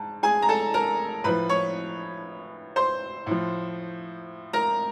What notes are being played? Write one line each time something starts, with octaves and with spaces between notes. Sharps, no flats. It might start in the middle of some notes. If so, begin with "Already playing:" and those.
Already playing: G#2 A5
G#4 G#5
A#5
A4 A5
A#4 A#5
A2 F3 B4 B5
C#5 C#6
C5 C6
A2 F3
A#4 A#5